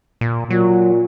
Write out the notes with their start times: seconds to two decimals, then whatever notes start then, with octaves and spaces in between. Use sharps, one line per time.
0.21 A#2
0.50 A#2 F#3